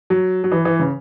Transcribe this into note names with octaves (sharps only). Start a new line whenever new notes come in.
F#3
F#3
E3
E3
C#3